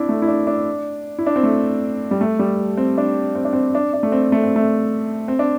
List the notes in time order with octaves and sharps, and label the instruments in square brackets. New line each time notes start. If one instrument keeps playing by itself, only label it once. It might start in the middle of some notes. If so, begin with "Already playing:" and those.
Already playing: [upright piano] C4 D4 E4
A3
E4
D4
D4
E4
D4
C4
A3
G3
A3
G3
C4
D4
C4
D4
C4
D4
D4
A3
C4
A3
C4
A3
C4
D4